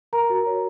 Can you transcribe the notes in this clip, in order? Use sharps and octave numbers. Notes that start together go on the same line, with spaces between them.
A#4 A#5
F#4
C#5